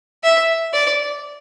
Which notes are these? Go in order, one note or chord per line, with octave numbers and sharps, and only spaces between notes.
E5
D5